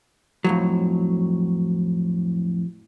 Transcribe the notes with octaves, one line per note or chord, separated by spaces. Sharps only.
F2 A2 F#3